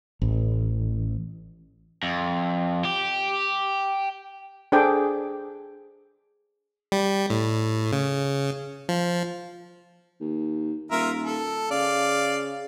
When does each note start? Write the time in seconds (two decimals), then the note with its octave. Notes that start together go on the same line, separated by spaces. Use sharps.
0.22 A1
2.03 F2
2.85 G4
4.72 D4 G#4 A4 C5 G5 D6
6.92 G3
7.30 A2
7.92 C#3
8.89 F3
10.21 D#2
10.91 D#1 F4 A#4 E5
11.24 A4
11.71 C#3 D5 F5